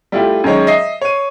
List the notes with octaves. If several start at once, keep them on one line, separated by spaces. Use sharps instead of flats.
G3 A3 E4 F4 G4
F#2 D#3 G#3 C#5
D#5 E5 C7
C#5 D#7